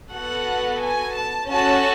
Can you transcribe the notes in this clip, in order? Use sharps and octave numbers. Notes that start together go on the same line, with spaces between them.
B3 F#4 A4 F#5
G#5
A5
C#4 F#4 A4 A5